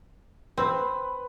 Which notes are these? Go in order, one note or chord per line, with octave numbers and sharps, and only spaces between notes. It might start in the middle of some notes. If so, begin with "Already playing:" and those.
C4 B4